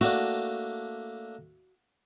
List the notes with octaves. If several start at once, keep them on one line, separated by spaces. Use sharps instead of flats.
A3 A#3 D4 F#4